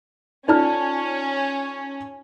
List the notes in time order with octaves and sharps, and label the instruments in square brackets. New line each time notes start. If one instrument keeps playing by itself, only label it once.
[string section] C#4 [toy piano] D#4 F4 D5 [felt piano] A4 A5 F6